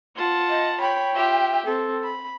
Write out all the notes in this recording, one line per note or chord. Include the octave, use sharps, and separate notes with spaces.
F4 F#5 A5
D#5
C#5 G5 B5
F4 G4 E5
C4 A4
B5